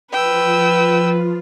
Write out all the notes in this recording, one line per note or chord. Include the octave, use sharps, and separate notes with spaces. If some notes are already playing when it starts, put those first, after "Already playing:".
F3 F4 B4 G5 E6